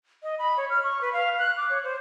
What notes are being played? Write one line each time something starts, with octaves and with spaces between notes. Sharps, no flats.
D#5
B5
C#5
F6
C#6
B4
F5
F#6
D6
C#5
C5